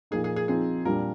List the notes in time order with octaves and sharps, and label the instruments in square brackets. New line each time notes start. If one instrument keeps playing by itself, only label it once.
[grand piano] A#2 F3 A#3 D#4 [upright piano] G#4
[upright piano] G#4
G#4
[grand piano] F3 C4 D#4 [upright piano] G#4
[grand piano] A#2 G3 D4 [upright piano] A#4